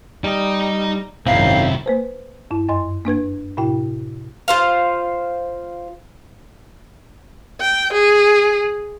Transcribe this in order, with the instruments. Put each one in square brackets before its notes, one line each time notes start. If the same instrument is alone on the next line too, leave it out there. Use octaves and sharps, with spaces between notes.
[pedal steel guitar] G3 [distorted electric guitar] D#4 D#5
[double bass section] G#1 C#2 F#2 [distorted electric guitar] C3 E4 [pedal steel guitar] C4 D#4 [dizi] F5
[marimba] A#3 B4 C5
G2 E4
F#2 D#5 C6
A#3 D4 B4 G#6
A2 C3 E4 G5
[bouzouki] F4 C5 F5
[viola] G5
G#4